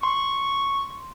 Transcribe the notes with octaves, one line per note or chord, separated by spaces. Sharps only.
C6 C#6